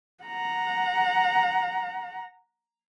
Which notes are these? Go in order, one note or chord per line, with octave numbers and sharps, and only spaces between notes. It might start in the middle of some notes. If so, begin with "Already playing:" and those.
F#5 A#5